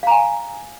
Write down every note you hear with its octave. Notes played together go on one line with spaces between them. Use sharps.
F5 G#5 A#5